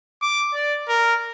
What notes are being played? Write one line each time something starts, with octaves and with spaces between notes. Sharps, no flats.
D6
D5
A#4